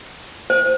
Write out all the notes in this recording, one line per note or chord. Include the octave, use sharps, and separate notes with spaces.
C5